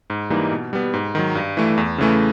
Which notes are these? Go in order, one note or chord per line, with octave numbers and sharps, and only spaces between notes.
G#2
E3 G3 A#3 D#4
B2
G3 B3
G#2
D#3 F#3
G2
E3 A3
E2
C#3 E3 A3